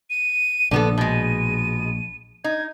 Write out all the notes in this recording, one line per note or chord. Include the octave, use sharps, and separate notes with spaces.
D#7
A#1 D3 B3 A4 D#7
B2 G#3
D#4 G#6